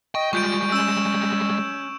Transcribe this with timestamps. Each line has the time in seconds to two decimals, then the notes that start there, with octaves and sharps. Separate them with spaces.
0.15 D#5 G5 C#6
0.33 G3 G#3 F4 C#6 G6 D7
0.72 C#4 E6 E7